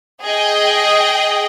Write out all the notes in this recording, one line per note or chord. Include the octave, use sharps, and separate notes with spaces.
G#4 D#5 G5